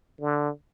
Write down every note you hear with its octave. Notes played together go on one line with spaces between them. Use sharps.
D3